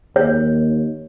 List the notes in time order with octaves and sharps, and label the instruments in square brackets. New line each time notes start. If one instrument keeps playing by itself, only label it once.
[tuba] D#2 [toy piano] C#5